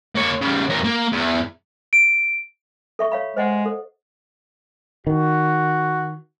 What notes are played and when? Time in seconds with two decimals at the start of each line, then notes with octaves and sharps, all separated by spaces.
0.15 A#3 C#5
0.41 C#3 G3
0.69 E2 A#4
0.84 A#3
1.12 E2
1.93 D7
2.99 A4 E5 C#6
3.12 C#5 F5 B5
3.37 G#3 C5 D#5 F#5
3.66 A4
5.07 D#3 F#4